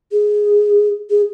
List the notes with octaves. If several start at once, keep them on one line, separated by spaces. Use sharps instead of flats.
G#4
G#4